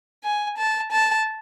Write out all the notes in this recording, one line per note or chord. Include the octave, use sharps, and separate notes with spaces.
G#5
A5
A5